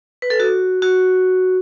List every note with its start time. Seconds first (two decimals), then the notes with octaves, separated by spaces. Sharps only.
0.22 B4
0.30 A4
0.40 F#4
0.82 F#4